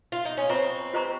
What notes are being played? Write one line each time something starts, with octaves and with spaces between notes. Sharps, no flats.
F4
D#4
C#4
C4 F4 C5 D#5 A#5 C#6
F4 C5 D#5 A#5 C#6